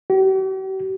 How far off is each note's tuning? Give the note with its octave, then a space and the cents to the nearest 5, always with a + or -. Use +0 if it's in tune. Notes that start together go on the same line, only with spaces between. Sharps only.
G4 -45